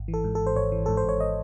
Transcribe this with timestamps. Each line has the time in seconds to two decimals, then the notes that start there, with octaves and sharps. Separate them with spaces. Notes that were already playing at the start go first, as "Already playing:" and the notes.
Already playing: G#1
0.08 E3
0.14 A4
0.24 G#2
0.35 A4
0.40 G#1
0.47 C5
0.56 G#1 C#5
0.72 E3
0.86 G#2 A4
0.97 C5
1.04 G#1 C#5
1.20 D#5